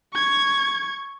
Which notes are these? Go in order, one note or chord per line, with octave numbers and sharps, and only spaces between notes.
C#6 G#6